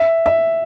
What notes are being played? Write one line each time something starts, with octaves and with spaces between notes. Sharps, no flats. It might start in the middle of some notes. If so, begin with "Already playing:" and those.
Already playing: E5
E5